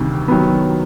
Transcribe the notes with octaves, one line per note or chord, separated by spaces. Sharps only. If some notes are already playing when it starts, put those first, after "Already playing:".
Already playing: D2 C3 D#3 G3
D#3 F#3 B3